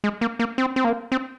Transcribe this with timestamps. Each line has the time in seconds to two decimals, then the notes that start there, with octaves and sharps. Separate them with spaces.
0.04 G#3
0.21 A#3
0.39 A#3
0.58 C4
0.76 C4
0.84 A#3
1.12 C4